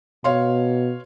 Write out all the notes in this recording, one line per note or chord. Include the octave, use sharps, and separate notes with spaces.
B2 C#5 F5 C6